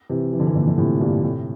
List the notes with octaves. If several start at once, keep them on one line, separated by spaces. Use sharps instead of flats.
C3 E3
E3
D3
C3 E3
A#2 D3
D3
A2 C3
G2 A#2
A2 C3